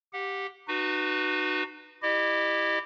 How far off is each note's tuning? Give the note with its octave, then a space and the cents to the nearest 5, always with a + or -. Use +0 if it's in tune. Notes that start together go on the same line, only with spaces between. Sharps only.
G4 +0 F#5 -25
D#4 -35 F#4 +0 B4 +0
E4 +0 G4 +5 D#5 -40